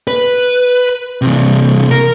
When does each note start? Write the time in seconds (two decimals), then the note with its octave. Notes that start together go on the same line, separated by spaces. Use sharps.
0.08 B4
1.22 C3 E3
1.91 A#4